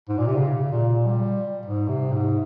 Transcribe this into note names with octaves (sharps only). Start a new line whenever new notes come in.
G#2
A#2
C3
C#3
A#2
G3
G#2
C3
G#2